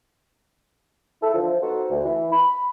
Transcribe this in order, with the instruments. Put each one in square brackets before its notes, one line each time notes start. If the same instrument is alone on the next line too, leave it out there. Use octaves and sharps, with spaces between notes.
[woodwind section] E4 A4
D3 E3 F3
B3 D#4 F#4 A4 C5
D2
E3
B5